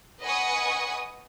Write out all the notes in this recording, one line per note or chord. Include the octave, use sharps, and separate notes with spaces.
B4 D#5 F#5 G#5 C#6 D#6